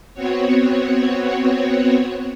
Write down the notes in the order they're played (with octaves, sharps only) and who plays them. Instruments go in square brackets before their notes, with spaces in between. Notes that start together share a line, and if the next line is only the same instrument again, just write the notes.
[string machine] B3 C4 F#4 C#5